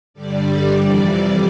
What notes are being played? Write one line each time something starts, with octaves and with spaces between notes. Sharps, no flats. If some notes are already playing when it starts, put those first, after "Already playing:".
G2 D3 G3 D5
F2 C3 E3 G3